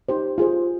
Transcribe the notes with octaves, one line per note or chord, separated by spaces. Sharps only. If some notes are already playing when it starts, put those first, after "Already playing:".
D#4 G4 C5
F4 G#4 C5